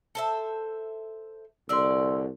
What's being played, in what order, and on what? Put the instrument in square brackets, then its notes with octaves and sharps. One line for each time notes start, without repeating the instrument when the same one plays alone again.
[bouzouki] A4 C5 E5
[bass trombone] C2 [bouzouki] D3 D5 [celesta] C6 E6